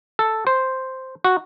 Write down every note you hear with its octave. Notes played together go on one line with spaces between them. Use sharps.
A4
C5
F#4